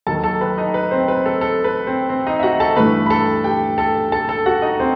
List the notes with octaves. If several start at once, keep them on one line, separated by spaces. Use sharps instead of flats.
D#2 D#3 F#3 A4 A5
A4 A5
B4 B5
D#4 D#5
B4
C4 C5
B4
A4
A4
B4
C4 C5
C4 C5
D#4 D#5
E5
F#4 F#5
A4 A5
G2 E3 A3 B4 B5
B5
A4 A5
G4 G5
A4 A5
A4 A5
A4 A5
F#4 F#5
D#4 D#5
C4 C5